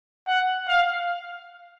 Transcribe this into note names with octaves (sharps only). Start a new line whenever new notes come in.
F#5
F5